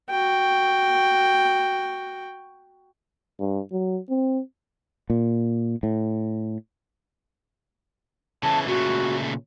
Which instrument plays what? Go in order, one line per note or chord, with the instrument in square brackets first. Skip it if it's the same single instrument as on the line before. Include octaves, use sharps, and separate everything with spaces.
[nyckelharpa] F#4 G5
[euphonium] G2
F#3
C4
[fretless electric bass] A#2
A2
[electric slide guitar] C#3 E3 [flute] A5
[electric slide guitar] A#2 C#3 A3 [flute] F#4